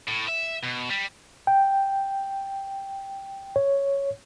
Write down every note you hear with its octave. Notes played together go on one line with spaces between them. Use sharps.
A2
E5
B2
G3
G5
C#5